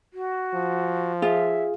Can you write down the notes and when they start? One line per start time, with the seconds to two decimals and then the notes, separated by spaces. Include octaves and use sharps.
0.14 F#4
0.54 F3
1.22 F4 G#4 E5